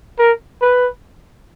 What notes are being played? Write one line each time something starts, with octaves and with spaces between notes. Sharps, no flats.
A#4
B4